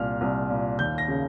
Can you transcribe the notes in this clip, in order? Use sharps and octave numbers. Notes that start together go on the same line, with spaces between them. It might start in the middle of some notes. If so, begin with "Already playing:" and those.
Already playing: C2 A#2 F6
C2
A#2
D#2 G6
A#6
C#3